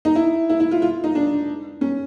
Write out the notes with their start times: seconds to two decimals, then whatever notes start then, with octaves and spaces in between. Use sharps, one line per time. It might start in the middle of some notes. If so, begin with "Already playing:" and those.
0.05 D#4
0.15 E4
0.50 E4
0.60 E4
0.71 F4
0.82 F4
1.04 D#4
1.15 D4
1.81 C#4